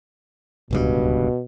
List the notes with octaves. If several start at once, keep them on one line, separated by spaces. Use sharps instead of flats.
D1 C#2 G2 B2